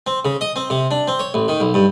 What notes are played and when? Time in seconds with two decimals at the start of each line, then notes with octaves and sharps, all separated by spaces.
0.07 C4
0.25 C#3
0.41 D#5
0.56 C4
0.70 C3
0.91 D4
1.08 C4
1.19 C#5
1.34 A1
1.48 D#3
1.60 B1
1.74 G2